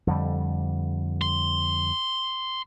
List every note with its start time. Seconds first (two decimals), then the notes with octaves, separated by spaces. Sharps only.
0.07 F2 D3 G3
1.22 C6